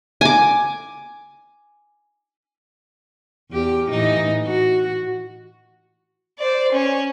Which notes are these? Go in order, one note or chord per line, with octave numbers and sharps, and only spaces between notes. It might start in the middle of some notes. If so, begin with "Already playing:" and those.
G#5 D6
E2 G4
A2 E3 D#4
F#4
C5 D5
C#4 C#5